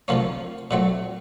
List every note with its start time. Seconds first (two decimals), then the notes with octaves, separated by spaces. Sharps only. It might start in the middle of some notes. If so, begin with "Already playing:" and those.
0.08 D2 C3 F3 A#3 C#4
0.71 A#2 F#3 A3 C4